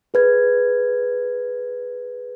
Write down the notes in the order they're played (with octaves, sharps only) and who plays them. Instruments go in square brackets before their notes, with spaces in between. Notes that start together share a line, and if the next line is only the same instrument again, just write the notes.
[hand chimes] G#4 B4 G#6